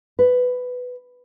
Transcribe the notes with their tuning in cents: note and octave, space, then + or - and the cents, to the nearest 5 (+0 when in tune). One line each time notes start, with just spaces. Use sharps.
B4 +10